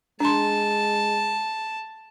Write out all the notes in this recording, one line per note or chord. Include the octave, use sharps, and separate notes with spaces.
G#3 D4 A5 C6